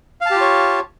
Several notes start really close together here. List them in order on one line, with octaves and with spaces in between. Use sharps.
F5 A5 G4 F4 C#5